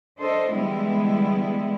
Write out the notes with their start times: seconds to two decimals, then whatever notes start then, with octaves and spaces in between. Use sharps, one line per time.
0.20 D4 A4 C5 D#5
0.52 D3 E3 G3 G#3 B3 E4